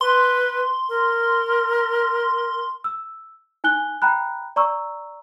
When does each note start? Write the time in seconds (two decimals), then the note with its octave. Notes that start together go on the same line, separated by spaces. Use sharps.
0.01 B4 C6
0.89 A#4
2.84 E6
3.64 D#4 G#5 F#6 G7
4.02 G5 A#5 B5 F#6
4.56 D5 A#5 C#6 E6